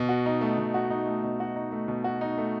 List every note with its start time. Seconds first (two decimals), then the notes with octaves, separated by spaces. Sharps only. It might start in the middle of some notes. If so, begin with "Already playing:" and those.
Already playing: B2
0.09 F#4
0.26 D#4
0.41 A3
0.58 B2
0.74 F#4
0.90 D#4
1.07 A3
1.23 B2
1.40 F#4
1.56 D#4
1.72 A3
1.88 B2
2.04 F#4
2.21 D#4
2.38 A3